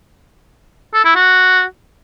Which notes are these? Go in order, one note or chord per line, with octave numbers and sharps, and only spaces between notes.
A4
E4
F#4